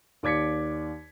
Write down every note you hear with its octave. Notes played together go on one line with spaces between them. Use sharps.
D#2 D5 D6 G#6 B6 C#7